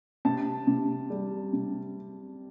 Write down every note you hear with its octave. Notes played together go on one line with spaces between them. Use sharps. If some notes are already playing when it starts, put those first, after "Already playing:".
C3 A5
C3
G3
C3